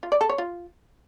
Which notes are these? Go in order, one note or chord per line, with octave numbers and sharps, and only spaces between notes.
F4
D5
A4
C#5
F4